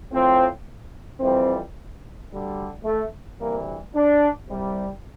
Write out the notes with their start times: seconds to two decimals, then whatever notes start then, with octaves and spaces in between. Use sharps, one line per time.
0.11 A2 F3 C4
1.20 F2 E3 G3 C4
2.30 D2 D3 G3
2.85 A3
3.39 D2 C3 E3 G3 A#3
3.94 D4
4.49 C2 C3 G3